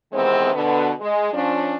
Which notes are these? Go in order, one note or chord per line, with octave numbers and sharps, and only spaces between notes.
C3 D#3 E3 G#3 B3 C4
B2 D3 B3
G#3
F3 C#4 D4